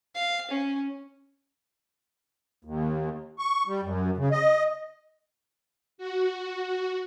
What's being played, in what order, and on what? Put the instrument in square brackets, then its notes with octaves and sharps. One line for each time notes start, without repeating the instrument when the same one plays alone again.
[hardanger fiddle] F5
C#4
[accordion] D#2
C#6
G3
F#2
C#3
D#5
[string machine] F#4